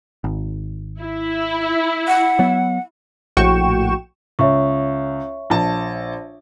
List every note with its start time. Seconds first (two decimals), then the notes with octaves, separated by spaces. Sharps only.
0.24 G#1
1.00 E4
2.07 F#5
2.39 F#3 B3
3.37 A#1 A2 F#4 G5 C#6 E7
4.39 C#2 C#5 E5 C#6
5.50 A#1 A5